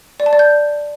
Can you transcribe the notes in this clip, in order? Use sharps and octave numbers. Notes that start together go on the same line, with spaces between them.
D5
A5
D5
G6